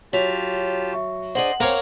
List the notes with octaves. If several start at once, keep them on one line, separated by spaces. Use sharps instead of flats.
F#3 F4 G4 C#5 A5 B6 F7
E5 C#6
D4 G#4 C5 D#5 F#5 C6 F#7
A#3 C4 A#4 C5 C#5 F5